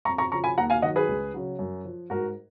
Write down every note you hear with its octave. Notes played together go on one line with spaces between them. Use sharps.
F2 A#5 C#6
A#5 C#6
C#3 F3 A#5 C#6
G#5 B5
D#2 F#5 A#5
F5 G#5
D#3 F#3 D#5 F#5
G#4 B4
C#2
C#3 F#3
F#2
F3
G#2 F#4 A#4